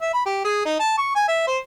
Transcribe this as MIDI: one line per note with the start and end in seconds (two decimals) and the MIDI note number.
0.01 0.10 76
0.13 0.21 83
0.26 0.40 67
0.45 0.61 68
0.65 0.77 63
0.79 0.96 81
0.98 1.13 85
1.15 1.26 80
1.28 1.43 76
1.47 1.58 72